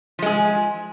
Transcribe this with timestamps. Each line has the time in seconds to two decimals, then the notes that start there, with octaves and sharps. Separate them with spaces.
0.19 F3
0.22 G#3
0.26 G#4